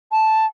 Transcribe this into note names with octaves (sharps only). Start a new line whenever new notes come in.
A5